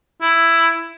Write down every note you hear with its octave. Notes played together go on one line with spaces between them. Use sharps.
E4